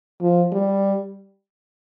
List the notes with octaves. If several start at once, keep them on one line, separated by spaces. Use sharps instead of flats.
F3
G3